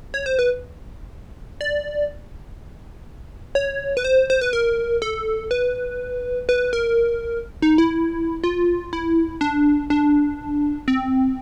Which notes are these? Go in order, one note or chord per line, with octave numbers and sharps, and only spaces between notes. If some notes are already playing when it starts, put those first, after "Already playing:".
C#5
C5
B4
D5
C#5
B4
C5
C5
B4
A#4
A4
B4
B4
A#4
D#4
E4
F4
E4
D4
D4
C4